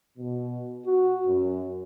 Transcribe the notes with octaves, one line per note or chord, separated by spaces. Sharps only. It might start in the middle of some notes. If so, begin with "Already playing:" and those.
B2
F#4
F#2